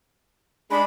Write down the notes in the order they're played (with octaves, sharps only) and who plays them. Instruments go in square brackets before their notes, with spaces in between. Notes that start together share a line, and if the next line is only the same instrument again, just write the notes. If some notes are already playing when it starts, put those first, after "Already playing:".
[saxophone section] G#3 D4 [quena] B5